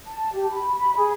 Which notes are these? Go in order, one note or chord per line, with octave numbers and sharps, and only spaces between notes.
A5
G4
B5
B5
G#4